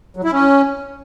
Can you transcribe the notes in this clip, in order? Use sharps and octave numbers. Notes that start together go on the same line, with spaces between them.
F#3
E4
C#4